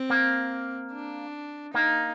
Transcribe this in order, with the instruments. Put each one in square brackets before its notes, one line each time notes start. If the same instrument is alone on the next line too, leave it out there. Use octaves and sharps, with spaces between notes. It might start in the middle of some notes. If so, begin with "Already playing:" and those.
Already playing: [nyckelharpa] C4
[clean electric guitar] A#3
[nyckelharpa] D4
[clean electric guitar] A#3 [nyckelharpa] D#4